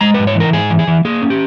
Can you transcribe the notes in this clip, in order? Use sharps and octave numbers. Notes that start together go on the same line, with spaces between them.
G#3 A#5
B4
G#2
C#5
E3 A#4
G#2 G#4
E3
G#4
E3
A#3 G#4
C#4
G4